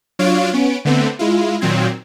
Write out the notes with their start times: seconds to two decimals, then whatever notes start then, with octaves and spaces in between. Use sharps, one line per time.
0.19 F#3 D4 F4 C#5 F5 D7
0.53 B3 C#4 D7
0.85 D3 A3 B3 C4
1.19 G#3 E4 F4
1.61 A#2 D#3 F#3 C4 G#6